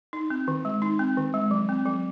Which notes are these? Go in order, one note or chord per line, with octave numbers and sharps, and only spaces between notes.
D#4
C4
D#3
G#3
D#4
C4
D#3
G#3
F#3
C4
F#3